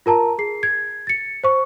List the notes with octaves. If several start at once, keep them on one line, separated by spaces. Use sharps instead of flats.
F4 A#4 A5 A#5
G#4 C7
G#6
A6 C#7
C5 C#6